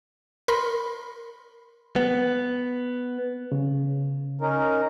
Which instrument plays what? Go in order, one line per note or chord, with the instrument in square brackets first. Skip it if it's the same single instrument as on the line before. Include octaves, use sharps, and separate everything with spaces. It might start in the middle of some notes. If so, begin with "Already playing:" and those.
[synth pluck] A#4 B5 C6
[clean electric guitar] B3
[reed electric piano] C#3
[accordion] C#4 D#4 A#4